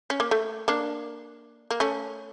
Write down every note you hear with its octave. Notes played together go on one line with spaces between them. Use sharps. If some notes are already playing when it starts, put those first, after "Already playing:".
C#4
A#3
A3
A#3 D4
A#3
A3 C#4